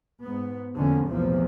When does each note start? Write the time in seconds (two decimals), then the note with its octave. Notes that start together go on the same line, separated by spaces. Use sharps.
0.23 G#2 B3
0.76 F1 E2 D3 F3 A#3 C#4
1.08 B1 E2 A2 C3 F3 A#3